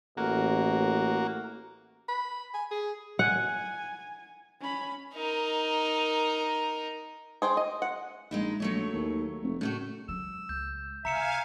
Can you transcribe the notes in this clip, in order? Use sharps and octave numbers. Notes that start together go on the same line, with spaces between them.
A1 A#3 F#4
B5
G#5
G#4
F#5 G#5
C#4 B5
D#4 A#4
G#4 C5 G5
D#5
F#5
A#1 G#3 D#4 E4
A#1 F#3 A3 C#5
D#2
F1
A2 C#3 A3 F#4
F#3 G#3 E6
C#2 G6
C3 E5 F5 G#5 A#5 C#7 E7